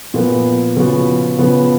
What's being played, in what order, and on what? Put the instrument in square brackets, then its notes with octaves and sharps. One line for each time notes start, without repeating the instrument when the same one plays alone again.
[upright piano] A#2 F3 B3
C#3 F3 B3 F#4
C#3 F3 B3